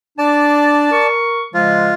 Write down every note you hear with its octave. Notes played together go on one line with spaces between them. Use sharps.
D4 D5 A5
A#4 C#6
C#3 F3 G#3 F4